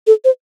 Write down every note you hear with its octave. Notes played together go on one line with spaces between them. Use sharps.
A4
C5